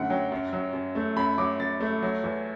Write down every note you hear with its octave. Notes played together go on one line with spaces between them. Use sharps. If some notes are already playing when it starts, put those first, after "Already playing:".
Already playing: F#2 D3 A3 F#5
F#3 G5
F#2
F#3
F#2
A3
F#2 B5
F#3 D6
F#2 A6
A3
F#3
E2